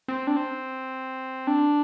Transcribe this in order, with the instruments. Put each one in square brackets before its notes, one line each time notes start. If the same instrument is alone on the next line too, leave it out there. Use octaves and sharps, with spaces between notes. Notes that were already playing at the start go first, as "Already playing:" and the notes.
[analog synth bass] C4
D4
C4
D4